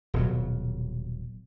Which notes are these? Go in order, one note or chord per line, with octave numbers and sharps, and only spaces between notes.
D#1 B2 F#3